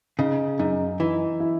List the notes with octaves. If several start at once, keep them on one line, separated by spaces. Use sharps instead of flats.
C#3 D#4
F#2 D#4
E3 D#4
E4